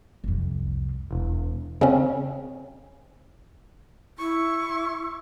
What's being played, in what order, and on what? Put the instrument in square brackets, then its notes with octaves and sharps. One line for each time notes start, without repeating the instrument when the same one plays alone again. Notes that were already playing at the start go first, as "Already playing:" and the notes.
[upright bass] C2 F2
[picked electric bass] E1
[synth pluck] C#3 C4 C#4
[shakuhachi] E4 [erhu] C#6